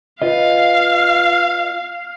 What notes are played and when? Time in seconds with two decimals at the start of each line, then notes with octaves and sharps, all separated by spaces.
0.22 F4 B4 D#5 F5